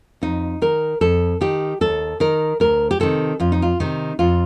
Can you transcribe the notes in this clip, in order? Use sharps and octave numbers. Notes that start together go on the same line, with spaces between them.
F2 D#4
D#3 A#4
F2 A4
D#3 G4
D#2 A4
D#3 A#4
D2 A#4
G4
C3 D#3 A4
F2 F4
D#4
F4
C3 D#3 D#4
F2 F4